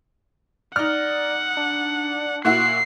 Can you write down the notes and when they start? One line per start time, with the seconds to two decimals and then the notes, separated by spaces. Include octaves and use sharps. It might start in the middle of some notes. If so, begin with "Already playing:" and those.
0.76 D#4 D5 F#5 F6
1.57 D4
2.45 A#2 E4 F#4 F#6 C7